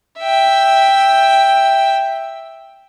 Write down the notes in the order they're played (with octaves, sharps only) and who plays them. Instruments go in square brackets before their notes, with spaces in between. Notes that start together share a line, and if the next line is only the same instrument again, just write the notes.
[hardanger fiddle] E5 G5